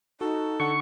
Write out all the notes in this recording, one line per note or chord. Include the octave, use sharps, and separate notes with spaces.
D#4 F#4 A4
D3 F#5 C#6